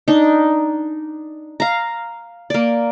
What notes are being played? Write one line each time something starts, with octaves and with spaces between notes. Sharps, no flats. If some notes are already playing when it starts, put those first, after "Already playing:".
D4 D#4
F5 A#5
A#3 D5